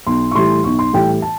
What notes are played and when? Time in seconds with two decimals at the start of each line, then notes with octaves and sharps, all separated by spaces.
0.07 B1 C6
0.31 C#6
0.35 A2 E3 G3 C6
0.64 B1 C#6
0.79 C6
0.93 A2 E3 G3 G5
1.22 A5